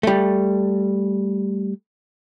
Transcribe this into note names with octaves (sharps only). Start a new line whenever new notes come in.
G3 A3